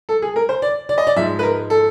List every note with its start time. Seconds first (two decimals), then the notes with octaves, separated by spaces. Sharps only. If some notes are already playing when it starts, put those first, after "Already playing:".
0.09 A4
0.22 G#4
0.36 A#4
0.49 C5
0.62 D5
0.89 D5
0.98 D#5
1.07 D5
1.16 G#2 F3 G#3 E5
1.39 B4
1.43 A#4
1.70 A4